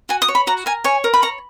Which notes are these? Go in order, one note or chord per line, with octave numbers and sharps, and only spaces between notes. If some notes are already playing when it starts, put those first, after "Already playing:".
F#4 G#5
D#6
C#5
B5
F#4 A#5
A#4 G#5
C#5 G#5
A#4
B5
C#5 A#5